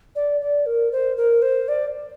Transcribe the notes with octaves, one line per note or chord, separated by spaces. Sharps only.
D5
D5
A#4
C5
A#4
C5
D5